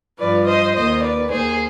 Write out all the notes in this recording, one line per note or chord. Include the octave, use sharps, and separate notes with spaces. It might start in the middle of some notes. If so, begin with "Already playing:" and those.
G2 F3 B4 D5
C5 D#5
D#2 D#3 C5 D#5
B4 D5
D#2 D#3 G#4 C5